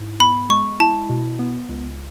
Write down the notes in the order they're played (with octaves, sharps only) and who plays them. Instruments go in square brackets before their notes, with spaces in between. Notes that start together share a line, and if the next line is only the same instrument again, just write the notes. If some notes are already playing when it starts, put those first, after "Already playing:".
Already playing: [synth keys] G#2 E4
[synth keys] B3 [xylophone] B5
[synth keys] G#3 [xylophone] C#6
[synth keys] E4 [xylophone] A5
[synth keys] B2
B3
C#2